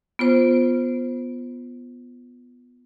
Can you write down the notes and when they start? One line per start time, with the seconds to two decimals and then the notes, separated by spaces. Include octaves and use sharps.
0.19 B3 F4 C5